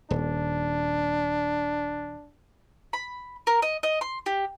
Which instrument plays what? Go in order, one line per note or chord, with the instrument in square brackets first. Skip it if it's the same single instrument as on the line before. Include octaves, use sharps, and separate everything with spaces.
[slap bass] D#1 [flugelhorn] D4
[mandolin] B5
A#4
D#5
D#5
C6
G4